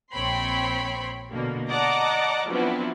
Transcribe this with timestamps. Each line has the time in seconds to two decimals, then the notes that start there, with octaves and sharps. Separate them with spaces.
0.12 A#1 C4 C#5 G5 B5 C6
1.31 B2 D3 A#3
1.72 D5 D#5 F#5 A5 A#5 D6
2.50 F3 F#3 B3 C4 D4 E4